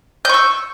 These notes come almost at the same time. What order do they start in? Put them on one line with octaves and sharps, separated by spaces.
G6 C#6 E6